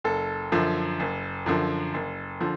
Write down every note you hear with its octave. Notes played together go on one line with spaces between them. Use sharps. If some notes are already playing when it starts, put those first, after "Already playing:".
F#1 A4
F#2 D3 F3
F#1
F#2 D3 F3
F#1
D3 F3